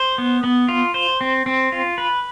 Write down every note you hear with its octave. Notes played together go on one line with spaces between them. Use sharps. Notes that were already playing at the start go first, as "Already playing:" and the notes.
Already playing: C5
B3
B3
F4
C5
C4
C4
F4
B4